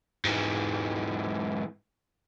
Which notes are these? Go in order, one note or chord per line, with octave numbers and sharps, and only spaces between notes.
G#2 E3